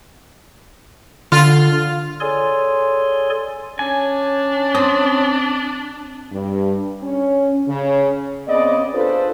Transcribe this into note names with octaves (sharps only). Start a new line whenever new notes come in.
D3 F4
G#4 A4 C#5 D5 G#5 C6
C#4 D4 G#5
C4 D#6
G2
C#4
C#3
C#3 B3 C4 D5 D#5
D4 F4 G#4 A4 B4 C5